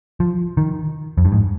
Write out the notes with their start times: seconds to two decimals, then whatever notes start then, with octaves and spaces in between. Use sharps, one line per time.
0.20 F3
0.57 D#3
1.18 F2
1.25 G2
1.32 G#2